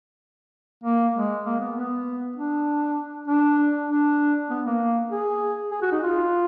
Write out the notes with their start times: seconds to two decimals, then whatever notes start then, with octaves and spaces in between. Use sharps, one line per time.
0.84 A#3
1.15 G#3
1.45 A#3
1.60 B3
1.76 B3
2.36 D4
3.28 D4
3.89 D4
4.50 B3
4.65 A#3
5.10 G#4
5.71 G#4
5.82 F#4
5.92 D#4
6.03 F4